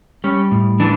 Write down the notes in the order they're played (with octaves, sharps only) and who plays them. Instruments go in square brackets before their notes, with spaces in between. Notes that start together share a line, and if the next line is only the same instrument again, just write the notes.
[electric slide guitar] G3 C#4
A2
E3 D4